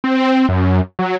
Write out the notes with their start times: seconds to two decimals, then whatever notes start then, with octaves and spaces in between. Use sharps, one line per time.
0.04 C4
0.49 F#2
0.99 F#3